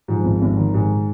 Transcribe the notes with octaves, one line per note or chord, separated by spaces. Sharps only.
G#2 F3
G#1
G#1
D#3
G#2